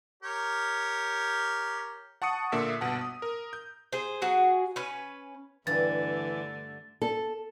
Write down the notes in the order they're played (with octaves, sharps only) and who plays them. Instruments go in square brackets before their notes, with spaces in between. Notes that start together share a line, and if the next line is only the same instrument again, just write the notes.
[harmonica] G4 A#4 C#5
[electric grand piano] F#5 A5 C#6 D#6 C#7
A#2 D3 A#3 E5 E6 B6
G1 B2 F#5 A5
D#6
A#4
G6
[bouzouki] G#4 C5
F#3 F#4 G#4
C#4 B4
[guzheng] G2 [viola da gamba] D3 A3 [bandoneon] E3 [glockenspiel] A6
[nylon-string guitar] A4